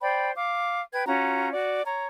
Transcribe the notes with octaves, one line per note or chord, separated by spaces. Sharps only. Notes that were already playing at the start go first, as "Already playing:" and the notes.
C5 D5 G5 B5
F5 D6
B4 G5 G#6
C#4 F4 F#4 A#5
F#4 D5
C#5 A#5